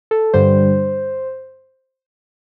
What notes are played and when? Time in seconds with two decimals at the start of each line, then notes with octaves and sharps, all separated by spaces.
0.11 A4
0.34 G2 D3 G3 C5